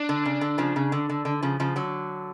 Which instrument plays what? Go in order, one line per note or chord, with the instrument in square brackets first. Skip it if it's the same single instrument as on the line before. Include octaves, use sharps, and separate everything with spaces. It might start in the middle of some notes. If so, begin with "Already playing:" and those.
Already playing: [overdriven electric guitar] D4
[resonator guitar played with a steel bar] D3
C#3
D3
C#3 F3
C#3
D3
D3
D3
C#3 F3
C#3 F3
D3 F#3